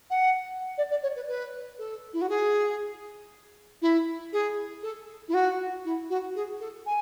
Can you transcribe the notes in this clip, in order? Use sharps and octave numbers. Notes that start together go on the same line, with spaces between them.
F#5
D5
D5
C#5
B4
B4
A4
E4
F#4
G#4
E4
G#4
A4
E4
F#4
E4
F#4
G#4
A4
G#5